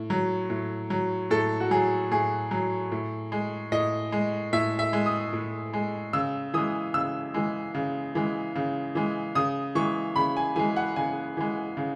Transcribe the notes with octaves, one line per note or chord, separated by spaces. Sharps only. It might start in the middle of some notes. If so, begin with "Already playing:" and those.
Already playing: A2
F#3
A2
F#3
A2 A4
F#4
F#3 G#4
A2 G#4
F#3
A2
G#3
A2 D#5
G#3
A2 E5
E5
G#3
D#6
A2
G#3
C#3 E6
E3 G#3 D#6
C#3 E6
E3 G#3
C#3
E3 G#3
C#3
E3 G#3
C#3 D#6
E3 G#3 C#6
C#3 B5
G#5
E3 G#3 G#5
F#5
C#3 G#5
E3 G#3
C#3